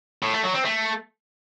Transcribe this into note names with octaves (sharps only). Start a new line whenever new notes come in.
A2
A3
F#3
C4
A3